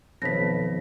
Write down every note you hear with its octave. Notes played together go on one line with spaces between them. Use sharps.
B1 F2 D#3 B3 C#5 A#6 B6